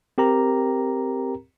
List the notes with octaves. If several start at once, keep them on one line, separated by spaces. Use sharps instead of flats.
C4 G4 A#4 A#5